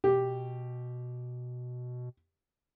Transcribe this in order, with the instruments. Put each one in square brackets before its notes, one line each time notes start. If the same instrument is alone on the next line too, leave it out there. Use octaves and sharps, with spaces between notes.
[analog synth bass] B2 [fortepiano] G4